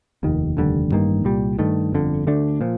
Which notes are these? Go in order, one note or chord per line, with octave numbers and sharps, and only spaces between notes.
F1 D#2 D#3
F1 D#2 D3 G3
A1 G2 D#3 A#3
C2 A#2 G3
G2 D#3 A3
G1 F2 D3
D2 D3 A3 D4
A#2 F3